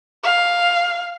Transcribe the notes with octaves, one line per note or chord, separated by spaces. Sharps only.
F5